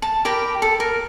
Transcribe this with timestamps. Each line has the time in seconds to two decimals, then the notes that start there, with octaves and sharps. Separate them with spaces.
0.02 A5
0.25 G4 A#4 G5 B5
0.62 A4
0.80 A#4